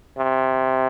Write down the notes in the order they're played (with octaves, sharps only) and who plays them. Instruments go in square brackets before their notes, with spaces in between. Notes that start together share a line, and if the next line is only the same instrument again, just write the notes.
[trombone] C3